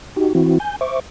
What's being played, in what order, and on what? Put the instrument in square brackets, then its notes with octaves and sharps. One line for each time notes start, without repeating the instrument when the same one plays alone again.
[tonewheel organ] D#4 F#4 G4
E3 C4 E4 F#4
G#5 G6
C5 E5 C#6 D6